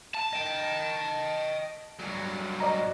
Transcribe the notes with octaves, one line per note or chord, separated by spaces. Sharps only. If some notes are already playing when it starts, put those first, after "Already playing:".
A5
D#5 G5
G2 F#3
D5 D#5 A#5